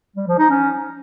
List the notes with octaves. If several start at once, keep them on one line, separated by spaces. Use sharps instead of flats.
G3
F3
D#4
C#4